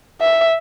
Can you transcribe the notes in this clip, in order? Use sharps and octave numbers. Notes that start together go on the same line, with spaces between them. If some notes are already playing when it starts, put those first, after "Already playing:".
E5